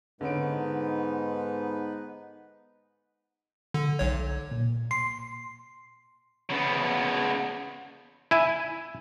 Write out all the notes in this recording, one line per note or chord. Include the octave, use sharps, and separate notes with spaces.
G#2 D3 B3 C#4 D#4 B4 D7
D3
B1 C#5
A#2
C6 C7
C#3 B3
E4 G#5